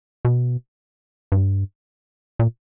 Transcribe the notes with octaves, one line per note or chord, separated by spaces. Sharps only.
B2
G2
A#2